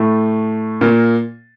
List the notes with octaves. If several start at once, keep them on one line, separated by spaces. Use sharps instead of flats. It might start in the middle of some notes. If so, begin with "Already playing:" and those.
Already playing: A2 A3
A#2 A#3